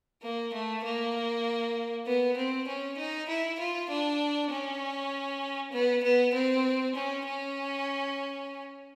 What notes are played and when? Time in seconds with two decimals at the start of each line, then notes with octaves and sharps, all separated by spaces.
0.23 A#3
0.54 A3
0.84 A#3
2.07 B3
2.37 C4
2.67 C#4
2.98 D#4
3.29 E4
3.59 F4
3.90 D4
4.51 C#4
5.72 B3
6.03 B3
6.34 C4
6.95 C#4
7.26 C#4